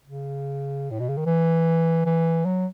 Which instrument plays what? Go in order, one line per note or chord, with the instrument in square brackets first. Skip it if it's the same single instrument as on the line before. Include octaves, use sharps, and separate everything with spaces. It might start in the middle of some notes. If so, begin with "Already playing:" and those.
[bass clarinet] C#3
A2
B2
C#3
D#3
E3
E3
F#3